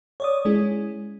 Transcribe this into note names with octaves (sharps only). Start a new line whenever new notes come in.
C#5 D5 D#6
G#3 C#4 E4 G#4